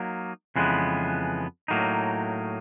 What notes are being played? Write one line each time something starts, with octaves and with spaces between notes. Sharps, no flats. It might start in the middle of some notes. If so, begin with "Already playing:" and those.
Already playing: F#3 A#3 D#4
F2 C#3 E3 G#3 B3
A2 F#3 A#3 D#4